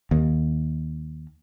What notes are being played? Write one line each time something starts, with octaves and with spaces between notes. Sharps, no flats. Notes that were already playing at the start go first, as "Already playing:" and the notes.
D#2